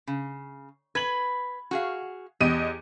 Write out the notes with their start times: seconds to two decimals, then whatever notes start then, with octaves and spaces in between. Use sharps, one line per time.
0.07 C#3
0.95 B4 G#6 F#7
1.71 F#4 G#4 F5
2.41 E2 G4 D#5 D#7